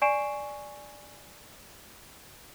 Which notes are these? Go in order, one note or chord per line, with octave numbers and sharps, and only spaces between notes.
D5 G#5 C#6 C7 D7 E7